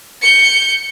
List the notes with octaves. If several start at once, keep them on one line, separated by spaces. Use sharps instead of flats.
G6 C#7